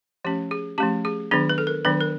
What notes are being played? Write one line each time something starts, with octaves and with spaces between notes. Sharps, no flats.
F3 A3 C#4 G4
G#4
F3 A3 C#4 G4
G#4
D#3 F#3 B3 D4 G#4
B4
A4
A#4
D#3 F#3 B3 D4 B4
A#4